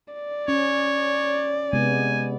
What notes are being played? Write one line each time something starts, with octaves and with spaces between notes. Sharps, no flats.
D5
C#4 C#5
C3 G#3 B3 G#5